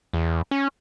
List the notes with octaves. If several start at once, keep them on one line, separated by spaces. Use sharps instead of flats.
E2
C#4